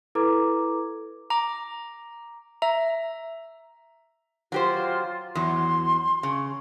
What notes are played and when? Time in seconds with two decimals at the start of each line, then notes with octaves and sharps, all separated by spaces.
0.15 E4 A4 B4 A#5 D6 G#6
1.30 A#5 D6
2.62 E5 A#5
4.52 F#3 F4 G4 C5
5.35 E2 F#3 C6
6.23 C#3